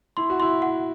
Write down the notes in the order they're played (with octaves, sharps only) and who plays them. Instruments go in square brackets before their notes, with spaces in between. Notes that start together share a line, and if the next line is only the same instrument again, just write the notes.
[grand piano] E4 [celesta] C6
[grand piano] F#4
[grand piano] E4 [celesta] C6
[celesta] F#5